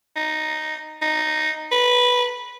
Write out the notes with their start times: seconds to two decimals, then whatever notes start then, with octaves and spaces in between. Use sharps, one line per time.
0.16 D#4
1.02 D#4
1.72 B4